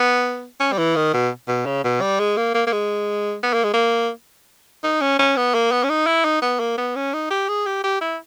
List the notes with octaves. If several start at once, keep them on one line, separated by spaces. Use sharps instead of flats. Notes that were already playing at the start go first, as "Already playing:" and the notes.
Already playing: B3
C#4
G3
E3
D#3
B2
B2
C#3
B2
G3
G#3
A#3
A#3
A#3
G#3
B3
A#3
G#3
A#3
D#4
C#4
C#4
B3
A#3
B3
C#4
D#4
E4
D#4
B3
A#3
B3
C#4
D#4
G4
G#4
G4
G4
E4